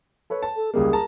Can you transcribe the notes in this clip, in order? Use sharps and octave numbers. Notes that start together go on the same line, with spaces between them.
A4 B4 C#5
A5
A4
C#2 G3 A#3 G#4
A#4 A5 A#5